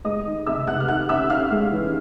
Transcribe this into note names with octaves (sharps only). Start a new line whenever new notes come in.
G#3 D#5 D#6
D#3
C3 E5 E6
C3 F#5 F#6
F6
D#3 F#5 F#6
C#4 E5 E6
C#4 F5 F6
G#3
E3